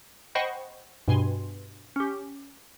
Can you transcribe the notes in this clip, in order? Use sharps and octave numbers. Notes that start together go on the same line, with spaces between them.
C5 D#5 F#5 G5 B5 C#6
G2 B2 G#5 C6
C#4 G4